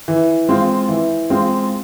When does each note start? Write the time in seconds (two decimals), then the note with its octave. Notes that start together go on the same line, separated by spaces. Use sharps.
0.08 E3
0.49 G#3 C4 F4
0.89 E3
1.30 G#3 C4 F4